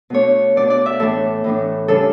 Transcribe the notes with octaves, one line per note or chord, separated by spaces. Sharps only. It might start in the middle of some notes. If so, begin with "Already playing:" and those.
B2 A3 D4 C#5
B2 A3 D4 D5
D5
E5
A2 E3 A3 D4 A4
A2 E3 A3 D4
C#3 G3 D4 A4